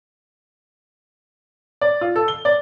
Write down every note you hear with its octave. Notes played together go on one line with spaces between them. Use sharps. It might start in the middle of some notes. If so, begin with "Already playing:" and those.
D5
F4
A4
G7
D5